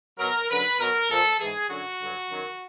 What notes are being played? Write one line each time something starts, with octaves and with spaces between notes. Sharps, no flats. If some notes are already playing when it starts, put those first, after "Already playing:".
B2 F#3 A#4
F#2 D3 F#3 B4
B2 F#3 A#4
A#2 F3 A4
G#2 E3 G#4
F#2 D3 F#3 F#4
G2 D3 F#3
F#2 D#3 F#3